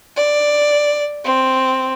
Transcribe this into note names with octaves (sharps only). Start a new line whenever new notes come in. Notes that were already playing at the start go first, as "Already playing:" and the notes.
D5
C4